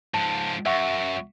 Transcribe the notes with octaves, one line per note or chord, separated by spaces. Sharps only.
G#2 F3 A5
F#2 E5 F#5 C#6